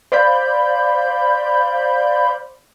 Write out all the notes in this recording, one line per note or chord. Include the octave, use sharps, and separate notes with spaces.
C5 D5 F5 B5 G6